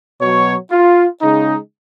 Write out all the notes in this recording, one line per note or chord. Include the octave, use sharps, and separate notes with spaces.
B2 F#3 C#5
F4
C#3 G#3 D#4